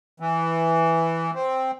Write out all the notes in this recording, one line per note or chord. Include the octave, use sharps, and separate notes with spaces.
E3
C4